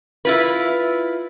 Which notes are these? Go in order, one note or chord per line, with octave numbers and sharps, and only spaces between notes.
E4 F4 B4